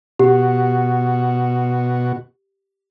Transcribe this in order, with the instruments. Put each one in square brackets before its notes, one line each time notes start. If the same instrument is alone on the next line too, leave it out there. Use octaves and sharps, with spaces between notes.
[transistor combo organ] B2 F#4 [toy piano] G4